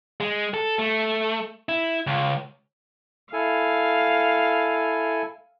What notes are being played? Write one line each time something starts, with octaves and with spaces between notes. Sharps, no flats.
G#3
A4
A3
E4
C#2
E4 A4 F5 G#5